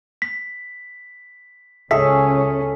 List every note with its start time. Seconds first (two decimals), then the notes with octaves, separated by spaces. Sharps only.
0.22 B6
1.91 C#2 C#4 G#4 A4 E5 B6